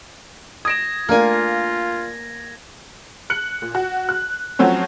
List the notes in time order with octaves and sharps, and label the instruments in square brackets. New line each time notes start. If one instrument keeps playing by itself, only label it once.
[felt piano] D#6 D7 E7 [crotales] G#6 A#6
[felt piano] A3 D4 A#4 [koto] A#3 G#5 [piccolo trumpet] F4
[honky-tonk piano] F#6 C#7 F#7
A#2
F#4
F#6
F3 F#3 A3 C4 C#4